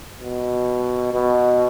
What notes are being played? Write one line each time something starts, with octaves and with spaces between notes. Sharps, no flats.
B2
B2